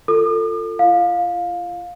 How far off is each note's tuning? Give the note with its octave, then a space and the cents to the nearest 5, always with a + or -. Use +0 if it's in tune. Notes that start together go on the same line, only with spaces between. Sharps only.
F4 +0 A4 +25 D6 +45
F4 -40 F5 +20